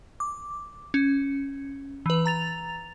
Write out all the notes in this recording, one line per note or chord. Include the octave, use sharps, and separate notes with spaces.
D6
C#4
E3 B4
A#5 A6 F7